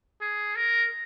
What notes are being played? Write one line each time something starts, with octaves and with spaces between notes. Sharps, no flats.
G#4
A#4